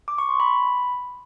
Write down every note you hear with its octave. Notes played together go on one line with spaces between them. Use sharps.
D6
C#6
C6
B5